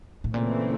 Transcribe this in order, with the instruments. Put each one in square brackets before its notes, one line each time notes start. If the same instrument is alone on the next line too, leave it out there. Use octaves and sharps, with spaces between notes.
[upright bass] A2
[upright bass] A#2 [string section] C#3 E3 A3 C4